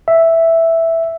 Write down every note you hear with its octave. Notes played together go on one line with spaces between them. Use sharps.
E5